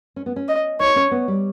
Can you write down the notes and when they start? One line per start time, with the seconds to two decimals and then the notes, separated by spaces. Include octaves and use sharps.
0.16 C#4
0.26 B3
0.36 C#4
0.48 D#5
0.80 D#4 C#5
0.96 C#4
1.11 B3
1.28 G3